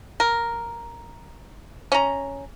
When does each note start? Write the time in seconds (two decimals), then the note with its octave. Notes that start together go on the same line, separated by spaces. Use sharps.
0.20 A#4
1.92 C#4 A#5